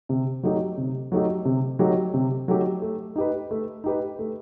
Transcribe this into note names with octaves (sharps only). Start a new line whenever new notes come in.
C3
F#3 A3 D#4 G4
C3
F#3 A3 D#4 G4
C3
F#3 A3 D#4 G4
C3
F#3 A3 D#4 G4
A3
D#4 G4 B4
A3
D#4 G4 B4
A3